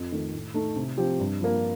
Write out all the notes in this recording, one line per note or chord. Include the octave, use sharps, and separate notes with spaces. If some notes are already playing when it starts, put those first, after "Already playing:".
Already playing: F2
D#3 A3
A2
A3 D#4
C3
F3 C4 G4
G2
F3 A#3